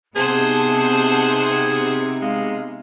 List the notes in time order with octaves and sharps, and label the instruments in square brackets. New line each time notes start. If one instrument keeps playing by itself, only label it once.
[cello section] C3 B3 D#4 [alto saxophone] G#4 [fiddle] C5 F#5 [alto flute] A5
[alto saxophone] G#3 [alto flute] F5